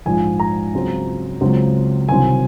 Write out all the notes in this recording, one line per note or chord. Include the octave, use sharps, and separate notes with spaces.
A#1 G#2 F3 G#5
A#5
C#2 C#3 F#3 C4
C#2 C#3 F#3 C4
C2 C3 D#3 F#3 C4 G#5